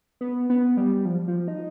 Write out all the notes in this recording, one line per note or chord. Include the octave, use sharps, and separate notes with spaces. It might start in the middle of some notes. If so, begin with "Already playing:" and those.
B3
B3
G3
F3
F3
D#4